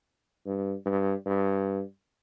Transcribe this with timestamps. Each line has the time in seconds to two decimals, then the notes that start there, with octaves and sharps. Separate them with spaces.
0.46 G2
0.86 G2
1.26 G2